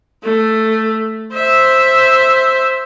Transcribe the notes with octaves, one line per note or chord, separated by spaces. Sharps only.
A3
C5 E5